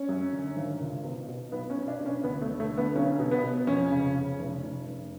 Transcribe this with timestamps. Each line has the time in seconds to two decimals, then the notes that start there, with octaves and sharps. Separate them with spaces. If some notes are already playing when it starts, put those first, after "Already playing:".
Already playing: C#4
0.09 F#2
0.33 D3
0.56 G#1
0.80 C#2
1.04 B2
1.28 B2
1.52 B1 B3
1.70 C#4
1.76 B1
1.88 D4
2.00 B2
2.06 C#4
2.24 D2 B3
2.42 A3
2.48 D3
2.60 A3
2.72 D3
2.78 B3
2.95 B1 C#4
3.19 B2
3.31 B3
3.43 B2
3.67 F2 C#4
3.91 C#3
4.15 C#3
4.39 F1
4.63 F1
4.87 F1